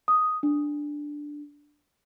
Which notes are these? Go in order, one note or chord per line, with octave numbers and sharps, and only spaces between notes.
D#6
D4